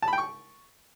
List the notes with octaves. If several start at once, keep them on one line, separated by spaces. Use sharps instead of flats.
A5
B5
G5
C#6